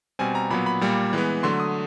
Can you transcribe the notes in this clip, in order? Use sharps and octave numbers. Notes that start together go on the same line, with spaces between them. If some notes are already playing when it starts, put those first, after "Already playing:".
B2 G3 C4 G#5
A#5
A#2 F#3 B3 B5
B5
A#2 G3 A#3
E3 G#3 B3
D3 F#3 A3 C6
D#6